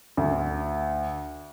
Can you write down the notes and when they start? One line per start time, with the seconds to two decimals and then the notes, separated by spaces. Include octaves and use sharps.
0.17 D2